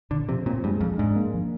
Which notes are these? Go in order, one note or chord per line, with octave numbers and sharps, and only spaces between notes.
A#2 D3
C3 F3
A#2 C4
G2 G#3
F2 F3
G#2 D4
A#3
F3